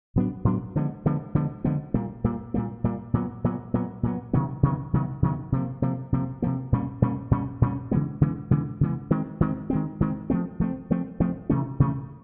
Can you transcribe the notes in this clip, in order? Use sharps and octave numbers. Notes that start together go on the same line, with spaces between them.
A2 F#3 B3 D4
A2 F#3 B3 D4
D3 F3 G#3 B3
D3 F3 G#3 B3
D3 F3 G#3 B3
D3 F3 G#3 B3
A#2 G3 A#3
A#2 G3 A#3
A#2 G3 A#3
A#2 G3 A#3
A#2 F#3 B3
A#2 F#3 B3
A#2 F#3 B3
A#2 F#3 B3
C3 D#3 F#3 B3
C3 D#3 F#3 B3
C3 D#3 F#3 B3
C3 D#3 F#3 B3
C3 F3 A#3
C3 F3 A#3
C3 F3 A#3
C3 F3 A#3
A#2 G3 A#3 C#4
A#2 G3 A#3 C#4
A#2 G3 A#3 C#4
A#2 G3 A#3 C#4
C#3 E3 G#3 B3
C#3 E3 G#3 B3
C#3 E3 G#3 B3
C#3 E3 G#3 B3
D#3 G#3 C4
D#3 G#3 C4
D#3 G#3 C4
D#3 G#3 C4
F3 A3 C4
F3 A3 C4
F3 A3 C4
F3 A3 C4
C3 E3 A3 C#4
C3 E3 A3 C#4